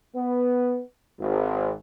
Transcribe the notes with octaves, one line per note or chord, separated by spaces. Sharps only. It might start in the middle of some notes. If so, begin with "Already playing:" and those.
B3
G#1